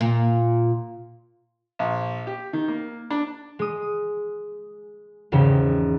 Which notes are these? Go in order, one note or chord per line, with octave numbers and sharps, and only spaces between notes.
A#2
A#1
G4
D#3
A#3
D4
G#3 D#6
G#1 E2 C#3 G4